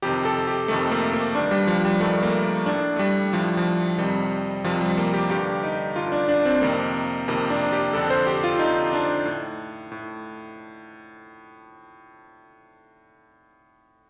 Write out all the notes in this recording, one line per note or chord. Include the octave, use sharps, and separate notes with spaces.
F2 C3 D#3 G4
A4
G4
F2 C3 D#3 A3
A#3
A#3
G2 D#3 D4
G3
F3
G3
G2 D#3 A3
A#3
A2 D4
A3
G3
A2 F3
F3
F2 C3 D#3 G3
F2 C3 D#3 F3
G3
A#3
G4
G2 D3 G4
D#4
G2 D3 F4
D4
D4
C4
F2 C3 D#3 A#3
F2 C3 D#3 A#3
D4
G4
F2 D3 A4
C5
G4
F4
F2 D3 D#4
D4
A2
A2